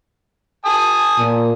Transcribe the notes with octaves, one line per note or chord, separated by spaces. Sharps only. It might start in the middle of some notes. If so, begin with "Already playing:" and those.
G#5 A5 D#6
A#2